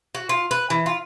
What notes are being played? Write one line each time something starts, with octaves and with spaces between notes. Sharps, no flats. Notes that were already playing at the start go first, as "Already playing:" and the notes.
F#4
F4
B4
E3
F4